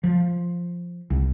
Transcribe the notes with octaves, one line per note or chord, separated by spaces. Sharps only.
F3
C2